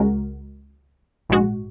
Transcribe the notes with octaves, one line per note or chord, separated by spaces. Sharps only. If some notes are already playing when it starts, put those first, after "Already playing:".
Already playing: C#2 C#3 G#3 F#4 A#4
A#1 G#2 G#3 F#4